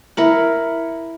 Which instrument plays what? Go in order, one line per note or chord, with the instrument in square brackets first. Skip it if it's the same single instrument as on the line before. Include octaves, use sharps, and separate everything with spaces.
[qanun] E4 A#4 F#5